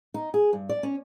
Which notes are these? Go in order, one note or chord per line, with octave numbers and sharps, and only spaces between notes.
D#4
G#4
G2
D5
C#4